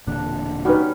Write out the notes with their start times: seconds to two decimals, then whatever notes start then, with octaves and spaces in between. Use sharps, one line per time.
0.07 E1 A#2 D3 D4
0.65 G3 B3 C#4 D#4 F#4 B4